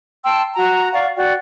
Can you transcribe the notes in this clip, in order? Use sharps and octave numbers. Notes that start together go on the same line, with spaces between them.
G5 A5 C6 E6
F#4 A#5
D5 F5 F#5 C#6
F#4 D5 G5